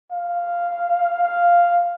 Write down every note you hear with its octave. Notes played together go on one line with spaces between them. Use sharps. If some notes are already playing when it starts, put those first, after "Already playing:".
F5
F5